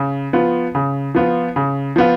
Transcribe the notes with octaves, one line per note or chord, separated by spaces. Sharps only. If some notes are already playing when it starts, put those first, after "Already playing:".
Already playing: C#3
F3 B3 F4
C#3
F3 B3 F4
C#3
F3 B3 F4